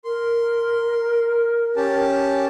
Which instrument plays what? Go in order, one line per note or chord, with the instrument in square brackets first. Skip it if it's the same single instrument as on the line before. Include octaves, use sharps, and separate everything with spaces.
[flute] A#4 [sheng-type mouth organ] C6
[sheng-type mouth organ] C#4 G4 A5